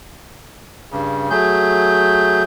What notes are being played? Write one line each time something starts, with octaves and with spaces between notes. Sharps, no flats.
G2 C#3
F#3 A3 G#4 G6